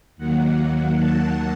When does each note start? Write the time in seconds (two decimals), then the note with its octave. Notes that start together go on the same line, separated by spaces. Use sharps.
0.17 D#2 D#3 F#3 A#3 F#5
0.99 A5